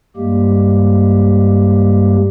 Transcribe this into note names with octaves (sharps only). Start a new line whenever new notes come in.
G2 G3 G#3 A#3 G4